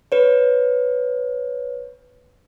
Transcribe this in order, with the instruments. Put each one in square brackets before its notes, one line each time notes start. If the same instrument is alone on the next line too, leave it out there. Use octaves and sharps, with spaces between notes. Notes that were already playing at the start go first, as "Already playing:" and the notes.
[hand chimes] B4 C#5